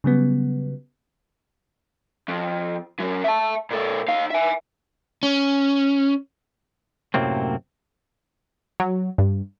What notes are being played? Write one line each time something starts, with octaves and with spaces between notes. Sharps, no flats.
C#3 F#3 G3 B3
F2
F#2 F#3
E5 A5
A#2 A4
D#4 F5
E5 G#5
C#4
F#2 A2 C3 F#3 A#3 C4
F#3
G2